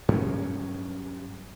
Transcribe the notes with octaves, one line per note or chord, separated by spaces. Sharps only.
G2 F#3 C#4